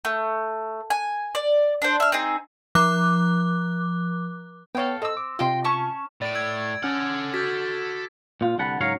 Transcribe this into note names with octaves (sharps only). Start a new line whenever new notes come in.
A3
G#5
D5
D4 C5
E5 F6
C4 D#4 G#4
F3 D6 F#6
B3 A4 C#5 F5 G5
C4 A4 D#5 E6
D6
C3 F4 D#5 G5 C6
C#4 A5 C#6
A2 D5 A6 D7
E6 G#6
C#4 A4 F#5 F6
F#4 D6 F6 G6 A6 B6
A#2 F4
C2 D3 F#5 A5 B5
G#2 C#3 F#3 A#4 C#5 F5